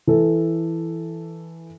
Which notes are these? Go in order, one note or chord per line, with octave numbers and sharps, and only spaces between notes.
E3 A4